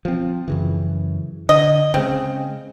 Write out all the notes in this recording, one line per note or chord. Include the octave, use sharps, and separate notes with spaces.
F3 C4
F#2 C#3 E3
D3 D#5
C#3 G#3 C4